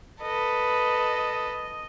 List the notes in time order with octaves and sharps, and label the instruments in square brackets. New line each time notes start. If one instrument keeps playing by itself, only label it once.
[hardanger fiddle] A4 B4 [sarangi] D#5